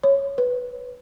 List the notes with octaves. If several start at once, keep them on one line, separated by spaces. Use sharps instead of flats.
C#5
B4